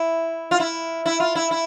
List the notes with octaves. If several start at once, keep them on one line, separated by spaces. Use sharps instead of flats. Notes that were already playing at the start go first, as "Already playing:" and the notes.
Already playing: E4
F4
E4
E4
F4
E4
E4